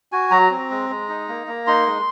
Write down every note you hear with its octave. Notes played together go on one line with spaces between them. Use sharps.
F#4 G#5
F#3 A#5
C4
G#3
G#3
D#4
A#3
A#3
D#4 C6
G#3